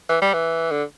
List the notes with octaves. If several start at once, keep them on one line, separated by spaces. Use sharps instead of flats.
E3
G3
E3
D3